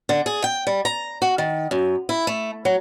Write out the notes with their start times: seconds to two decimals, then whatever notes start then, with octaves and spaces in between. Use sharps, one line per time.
0.09 D3
0.26 G#4
0.44 G5
0.67 G3
0.85 A#5
1.22 F#4
1.38 D#3
1.71 F#2
2.09 E4
2.27 A3
2.65 F#3